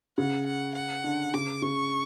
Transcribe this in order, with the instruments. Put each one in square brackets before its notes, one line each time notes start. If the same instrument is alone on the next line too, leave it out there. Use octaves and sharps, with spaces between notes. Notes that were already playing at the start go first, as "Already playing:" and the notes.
[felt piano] C#3 [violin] F#5
[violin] F#5
F#5
[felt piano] D3
[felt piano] C#3 [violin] D6
[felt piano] C#3 [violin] C#6